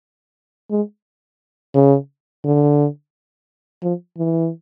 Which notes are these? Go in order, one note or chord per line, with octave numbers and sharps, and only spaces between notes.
G#3
C#3
D3
F3
E3